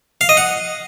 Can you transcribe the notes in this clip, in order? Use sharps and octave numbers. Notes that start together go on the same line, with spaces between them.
F5
D#5
F#5